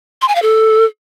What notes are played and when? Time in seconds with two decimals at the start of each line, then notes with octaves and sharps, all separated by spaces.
0.22 C6
0.29 G#5
0.35 F5
0.42 A4